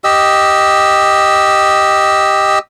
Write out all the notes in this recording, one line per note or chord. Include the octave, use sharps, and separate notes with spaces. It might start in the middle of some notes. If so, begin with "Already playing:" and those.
G4 D#5 E6